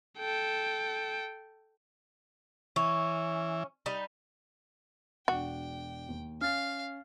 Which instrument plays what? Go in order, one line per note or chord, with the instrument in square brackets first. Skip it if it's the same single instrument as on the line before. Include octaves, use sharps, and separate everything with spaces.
[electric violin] A4 G5
[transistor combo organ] E3 [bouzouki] C#4
[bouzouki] G3 D#4
[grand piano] E1 D4 [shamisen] F#4 [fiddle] G5
[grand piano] D#2
[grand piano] C#4 [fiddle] F5 [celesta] F6 A6